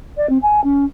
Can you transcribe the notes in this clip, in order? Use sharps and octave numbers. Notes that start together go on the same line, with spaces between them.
D5
C4
G#5
C#4